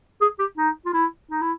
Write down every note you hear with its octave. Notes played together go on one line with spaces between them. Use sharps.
G#4
G4
D#4
F4
E4
D#4
E4